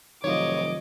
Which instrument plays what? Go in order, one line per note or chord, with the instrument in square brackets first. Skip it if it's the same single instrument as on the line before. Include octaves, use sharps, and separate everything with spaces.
[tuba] F1 [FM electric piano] D#3 F#3 F4 [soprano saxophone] C#5 [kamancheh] D#5 D6